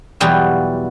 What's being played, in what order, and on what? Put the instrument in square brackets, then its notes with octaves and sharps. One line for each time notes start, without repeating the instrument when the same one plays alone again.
[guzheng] E2 B2 F#3 G3 F4 G4